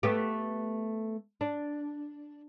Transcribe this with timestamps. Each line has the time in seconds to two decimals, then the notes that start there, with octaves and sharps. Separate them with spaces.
0.03 A3 B3 G4
1.41 D4